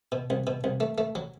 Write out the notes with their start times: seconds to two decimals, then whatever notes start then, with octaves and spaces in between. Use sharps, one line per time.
0.12 B2
0.30 C2
0.47 B2
0.64 C2
0.80 A3
0.98 A3
1.15 F#3